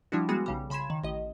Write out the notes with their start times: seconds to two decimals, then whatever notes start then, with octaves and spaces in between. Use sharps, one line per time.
0.12 F3 G3 D4 E4 F#4
0.29 G3 G#3 B3 F#4 G#4
0.46 B1 C#3 G3
0.70 C#3 B5 C6 G#6 E7
0.90 D#3
1.03 A1 D#5